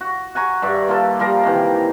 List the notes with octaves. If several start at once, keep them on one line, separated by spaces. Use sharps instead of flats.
F#4
F#5 G#5 A#5 C#6
G2 D5 E5
A#3 F4 A4
F3 G3 A#4 A#5
C3 D#3 E3